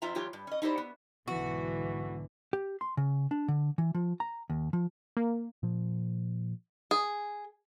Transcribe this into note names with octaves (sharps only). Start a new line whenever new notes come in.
F2 C4 F4 E5 A#5
E2 F#3 F4 G4 C#5
G2
C#4 D#5
D#4 E4 G4 C5 D5
B3
B1 G#2 D3 E3 F#4
G4
C6
C#3
D4
D3
E3
F3
A#5
D#2
F3
A#3
A#2 F3
G#4